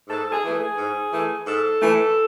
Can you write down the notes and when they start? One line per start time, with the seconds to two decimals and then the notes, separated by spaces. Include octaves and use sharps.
0.08 G#2 A4
0.31 G#4
0.43 E3 A3
0.55 G#4
0.78 G#2
1.12 E3 A3
1.46 G#2 A4
1.81 E3 A3